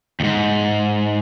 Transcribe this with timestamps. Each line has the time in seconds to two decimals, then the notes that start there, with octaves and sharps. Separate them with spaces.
0.20 D#2 G#2